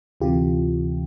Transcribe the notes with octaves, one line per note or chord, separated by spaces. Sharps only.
D2 C3 E3 F4 G4